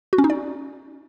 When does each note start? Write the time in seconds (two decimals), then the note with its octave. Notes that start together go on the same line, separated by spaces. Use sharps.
0.13 F#4
0.18 C#4
0.24 D#4
0.30 D5